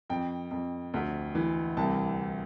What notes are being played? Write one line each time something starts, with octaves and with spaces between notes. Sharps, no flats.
F2 G5
F2
D2
E3
C2 A5